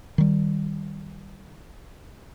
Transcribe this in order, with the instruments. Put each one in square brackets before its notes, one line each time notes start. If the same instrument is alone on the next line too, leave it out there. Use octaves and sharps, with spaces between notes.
[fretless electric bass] D#3 G3